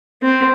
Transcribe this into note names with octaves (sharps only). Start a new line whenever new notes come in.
C4